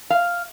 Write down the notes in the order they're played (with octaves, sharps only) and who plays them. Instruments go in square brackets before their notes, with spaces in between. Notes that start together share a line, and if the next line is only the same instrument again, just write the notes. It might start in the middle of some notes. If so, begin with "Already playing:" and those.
[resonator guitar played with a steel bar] F5